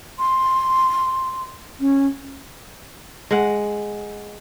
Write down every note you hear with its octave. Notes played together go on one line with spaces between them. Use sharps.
C6
C#4
G#3 F#5